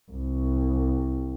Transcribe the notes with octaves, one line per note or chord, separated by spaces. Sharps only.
C2